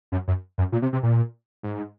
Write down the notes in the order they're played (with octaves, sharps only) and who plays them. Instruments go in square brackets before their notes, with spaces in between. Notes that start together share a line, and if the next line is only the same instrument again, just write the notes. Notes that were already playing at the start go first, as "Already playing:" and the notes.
[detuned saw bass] F#2
F#2
F#2
A#2
C3
C3
A#2
G#2